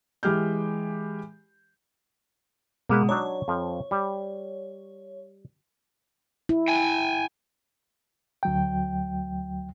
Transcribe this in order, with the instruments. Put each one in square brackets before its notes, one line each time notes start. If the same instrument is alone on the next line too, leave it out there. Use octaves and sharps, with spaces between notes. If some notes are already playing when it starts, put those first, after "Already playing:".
[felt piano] E3 G#3 G4 F6 G6
[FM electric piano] B2 G#3 [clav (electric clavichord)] A#3 B4
[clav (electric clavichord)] F#3 D4 D#4 [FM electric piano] C#5
[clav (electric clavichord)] F2 F3
G3
[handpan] E4
[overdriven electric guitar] G5 G#5
[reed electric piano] D2 F#3 G5